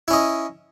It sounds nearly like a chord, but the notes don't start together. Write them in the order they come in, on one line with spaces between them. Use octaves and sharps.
E4 C#4 D#5